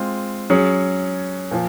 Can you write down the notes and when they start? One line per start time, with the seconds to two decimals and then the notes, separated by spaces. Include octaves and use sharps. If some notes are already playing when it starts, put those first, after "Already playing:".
Already playing: G#3 C4 F4
0.50 F#3 C#4 G#4
1.51 A#2 F3